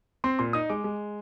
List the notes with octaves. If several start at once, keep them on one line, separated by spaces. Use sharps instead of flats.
C4 C6
A#2 C6
D#4 D#6
G#3 D6
G#3